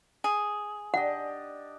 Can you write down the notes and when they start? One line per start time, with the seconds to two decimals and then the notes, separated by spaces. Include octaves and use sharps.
0.24 G#4
0.94 D4 G4 D#5 F#5